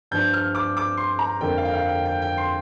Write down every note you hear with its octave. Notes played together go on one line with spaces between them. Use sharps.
G2 F3 D4 G6
F6
D6
D6
C6
A#5
F2 D3 A#3 G5
F5
G5
F5
G5
G5
G5
C6